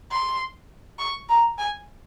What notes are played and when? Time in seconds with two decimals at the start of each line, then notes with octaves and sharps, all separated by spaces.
0.11 C6
0.99 C#6
1.29 A#5
1.58 G#5